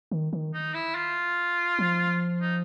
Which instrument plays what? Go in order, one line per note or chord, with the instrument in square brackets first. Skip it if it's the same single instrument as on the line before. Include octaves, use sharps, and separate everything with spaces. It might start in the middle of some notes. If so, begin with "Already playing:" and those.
[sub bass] D#3
D#3
[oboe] D#4
E4
F4
[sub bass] F3
[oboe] D#4